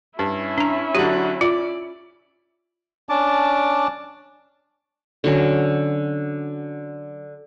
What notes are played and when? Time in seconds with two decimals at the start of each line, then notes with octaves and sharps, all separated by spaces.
0.19 G2 C#4 E4
0.58 D4 A#5
0.95 D3 F#3 G4
1.41 F4 D5
3.09 C#4 D4 A5 D6
5.24 D3 F#3 C#4